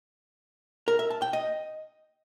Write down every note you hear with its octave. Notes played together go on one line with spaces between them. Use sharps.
A#4
E5
A5
G5
D#5